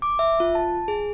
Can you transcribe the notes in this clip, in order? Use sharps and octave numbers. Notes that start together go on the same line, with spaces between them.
D6
E5
F4
A5
G#4